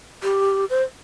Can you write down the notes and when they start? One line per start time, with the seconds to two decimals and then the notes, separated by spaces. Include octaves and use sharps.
0.23 G4
0.70 C5